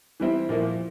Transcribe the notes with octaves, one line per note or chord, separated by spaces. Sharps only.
E3 G3 C4 E4
A#2 F3 A#3 E4